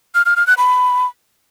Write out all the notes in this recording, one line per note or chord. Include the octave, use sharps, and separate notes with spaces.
F6
F6
F6
F#6
B5